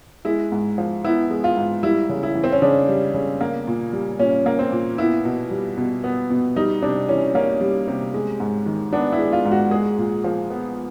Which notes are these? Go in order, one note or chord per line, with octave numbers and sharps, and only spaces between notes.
G#3 E4
G#2
F3
B3 E4
G#3
F4
G#2
G3 E4
C#3
E4
E3
C4
C#4
C#3 D4
G3
C#3
A#3
A#2
G3
A#2 C#4
A#3
C4
A#2
B3 E4
B2
G3
B2
B3
B2
G3 D#4
C3 D4
E3 C#4
A#3 C#4
G3
C3
G#3
G#2
D#3
B3 D4
E4
G#3
F4
G#2
F#4
G#3 G#4
A#2
F3
B3